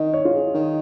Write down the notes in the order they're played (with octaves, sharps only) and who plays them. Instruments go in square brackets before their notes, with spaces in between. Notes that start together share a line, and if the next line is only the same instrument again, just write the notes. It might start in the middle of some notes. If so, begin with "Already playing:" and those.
Already playing: [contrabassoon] D#3 [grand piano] D#5
[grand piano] C#5
F4
G#4
[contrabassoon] D#3